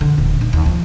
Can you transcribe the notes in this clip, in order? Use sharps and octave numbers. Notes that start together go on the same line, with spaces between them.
D3
D#1
D#4
D#2
F3